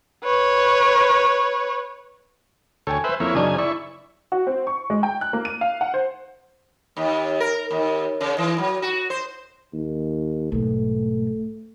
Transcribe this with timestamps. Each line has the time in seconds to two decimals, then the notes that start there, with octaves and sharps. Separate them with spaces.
0.24 B4 C#5
2.87 D2 A4 C#5 G5 G#5
3.04 B4 C5 E5
3.20 F2 A#3 E4 C#5
3.35 F#2 C#3 D4 D#4 G#5
3.58 E4 D5 C#6
4.32 F#4
4.47 C4
4.67 C#6
4.90 G#3
5.03 G5
5.21 F#6
5.33 A#3
5.45 D#7
5.61 F5
5.81 F#5
5.94 C5
6.97 D#2
7.40 A#4
7.71 D#2
8.21 C#3
8.38 E3
8.58 F#3
8.82 F#4
9.10 C5
9.73 D#2
10.52 B1 G#2 A3